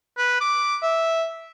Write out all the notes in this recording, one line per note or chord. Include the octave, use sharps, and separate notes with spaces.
B4
D6
E5